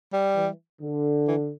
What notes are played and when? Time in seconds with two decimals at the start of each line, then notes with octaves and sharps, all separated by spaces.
0.13 G3
0.35 E3
0.81 D3
1.28 E3